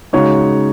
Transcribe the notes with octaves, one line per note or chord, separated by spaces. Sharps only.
C#3 G#3 D#4 F#4 C#5